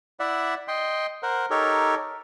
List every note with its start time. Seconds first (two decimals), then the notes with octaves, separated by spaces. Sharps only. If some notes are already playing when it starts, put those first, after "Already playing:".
0.20 E4 D5 E5 F#5
0.68 D#5 G5 C6
1.23 A#4 C5 F#5
1.50 D#4 G4 A4 A#4 C#5